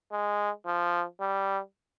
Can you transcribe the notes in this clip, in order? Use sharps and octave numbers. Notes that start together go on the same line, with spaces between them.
G#3
F3
G3